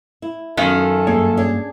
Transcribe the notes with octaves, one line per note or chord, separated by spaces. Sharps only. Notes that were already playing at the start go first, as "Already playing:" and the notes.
E4
F#2 D#3 B3 C#4 F4 A4
G2 A#3 G#4 C#5
C#4 D4 G#4